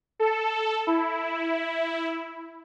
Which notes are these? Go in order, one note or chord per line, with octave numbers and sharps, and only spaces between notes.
A4
E4